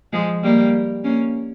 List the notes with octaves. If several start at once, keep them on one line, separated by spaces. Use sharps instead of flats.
F3 G#3
G3 A#3
A#3 C#4